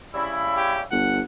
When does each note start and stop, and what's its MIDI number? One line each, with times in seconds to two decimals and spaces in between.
0.14 0.82 49
0.14 0.82 55
0.14 0.82 64
0.57 0.82 67
0.91 1.21 31
0.91 1.22 78